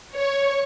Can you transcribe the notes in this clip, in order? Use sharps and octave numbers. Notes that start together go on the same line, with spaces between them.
C#5